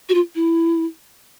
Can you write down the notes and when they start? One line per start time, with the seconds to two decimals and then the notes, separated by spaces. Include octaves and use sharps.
0.09 F#4
0.14 F4
0.35 E4